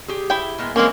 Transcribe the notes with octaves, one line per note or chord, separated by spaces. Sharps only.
G4 G#4
E4 G5
A#2 G#3 B3
E3 G#3 A#3 C4 C#4 A#4